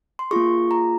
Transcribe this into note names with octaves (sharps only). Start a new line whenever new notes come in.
C6
A#3 F4 G#4 C#6
A#5